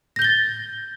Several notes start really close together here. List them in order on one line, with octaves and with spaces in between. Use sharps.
A#6 G6 G7 A6